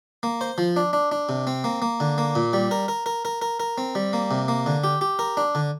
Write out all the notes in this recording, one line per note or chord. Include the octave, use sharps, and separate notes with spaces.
A#3
C5
F3
D4
D4
D4
C3
C4
A#3
A#3
D3
A#3
A#2
G3
A#4
A#4
A#4
A#4
A#4
A#4
C4
G3
A#3
C3
A#3
D3
G4
G4
A#4
D4
D3